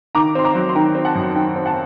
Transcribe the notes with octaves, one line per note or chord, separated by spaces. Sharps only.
D#3 A#5 D6
C4 C6
A#5 D6
F#3
C6
D#3 G5 A#5
C4
F#5 A5
F#2
D#3 G5
C4
F#5 A5